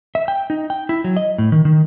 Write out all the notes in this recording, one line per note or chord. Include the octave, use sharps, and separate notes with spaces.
E5
G5
D#4
G5
E4
F#3
D#5
A2
D#3
D#3